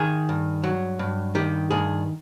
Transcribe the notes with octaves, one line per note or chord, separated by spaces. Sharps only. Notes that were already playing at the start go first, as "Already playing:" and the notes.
Already playing: D#3 G#4
G2
F#3
G2
D#3 G4
G2 G#4